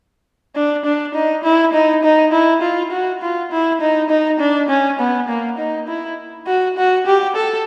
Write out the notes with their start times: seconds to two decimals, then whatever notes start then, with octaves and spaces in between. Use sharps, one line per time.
0.55 D4
0.85 D4
1.14 D#4
1.44 E4
1.73 D#4
2.04 D#4
2.33 E4
2.62 F4
2.91 F#4
3.22 F4
3.52 E4
3.81 D#4
4.10 D#4
4.40 D4
4.69 C#4
4.99 B3
5.28 A#3
5.58 D#4
5.88 E4
6.47 F#4
6.77 F#4
7.06 G4
7.36 A4